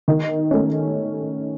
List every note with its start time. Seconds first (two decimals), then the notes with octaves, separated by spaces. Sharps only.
0.08 D#3
0.51 A3 C#4